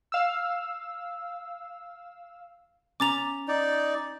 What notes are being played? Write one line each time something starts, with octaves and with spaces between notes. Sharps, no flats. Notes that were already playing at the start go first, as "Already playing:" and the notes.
F5 E6
C#4 A#5 D6 A6 F7
D#4 D5